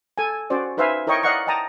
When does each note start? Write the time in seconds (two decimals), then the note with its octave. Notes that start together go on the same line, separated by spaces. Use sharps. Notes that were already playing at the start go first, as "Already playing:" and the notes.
0.18 A4 G#5
0.50 C#4 F#4 C5 D5
0.77 D#4 B4 C5 E5 F5 G#5
1.07 E4 A#4 C#5 D#5 G5 C#6
1.23 D5 D#5 F5 F#5 A#5 C#6
1.47 D#5 G5 A5 A#5 D#6